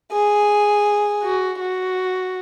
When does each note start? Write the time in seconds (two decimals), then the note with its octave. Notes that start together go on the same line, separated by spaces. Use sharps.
0.12 G#4
1.23 F#4
1.60 F#4